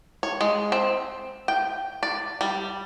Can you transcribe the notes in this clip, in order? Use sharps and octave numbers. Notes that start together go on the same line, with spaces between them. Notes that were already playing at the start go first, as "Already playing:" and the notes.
C#5
G#3
C4
G5
D5
G3